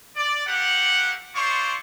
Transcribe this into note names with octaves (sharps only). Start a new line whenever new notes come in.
D5
A3 A#3 G4 F#5
E4 F4 C5 D5 C#6